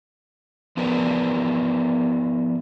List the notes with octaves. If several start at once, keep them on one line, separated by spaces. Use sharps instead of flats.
F3 B3 A#4 B4 D5